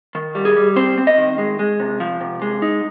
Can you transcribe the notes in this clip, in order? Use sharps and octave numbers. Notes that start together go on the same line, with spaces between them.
D#3
G3
G#4
G3
C4 C5
C4
D#5
D#3
G#3
G#3
C3
F3
C3
G#3
D#4